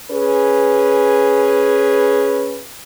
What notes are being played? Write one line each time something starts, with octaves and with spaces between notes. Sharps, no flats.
C#4 G#4 B4